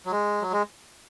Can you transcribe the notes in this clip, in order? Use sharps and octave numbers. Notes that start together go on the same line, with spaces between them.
F#3
G#3
F#3
G#3